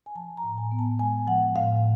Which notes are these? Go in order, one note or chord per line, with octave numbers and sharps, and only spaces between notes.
G#5
F3 A5
A#5
A2
G#5
B3
A5
G#3 G#5
F3 F#5
A2 F5